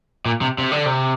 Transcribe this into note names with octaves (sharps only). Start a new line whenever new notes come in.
A#2
C3
C3
D3
C3